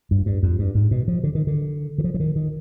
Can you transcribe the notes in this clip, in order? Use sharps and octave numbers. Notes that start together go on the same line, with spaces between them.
G2
G2
F2
G2
G#2
B2
F3
D3
D#3
D3
D#3
F3
F3
D#3
D#3